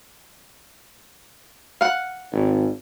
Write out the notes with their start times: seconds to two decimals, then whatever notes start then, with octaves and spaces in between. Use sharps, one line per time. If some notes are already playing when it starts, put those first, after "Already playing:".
1.81 F5 F#5
2.32 G#1